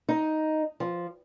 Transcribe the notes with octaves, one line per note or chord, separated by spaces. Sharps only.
D#4
F3